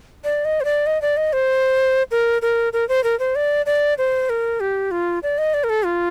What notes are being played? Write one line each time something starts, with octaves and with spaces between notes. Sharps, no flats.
D5
D#5
C5
D5
D#5
D5
D#5
C5
A#4
A#4
A#4
C5
A#4
C5
D5
D5
C5
A#4
G4
F4
D5
D#5
D5
A#4
A4
F4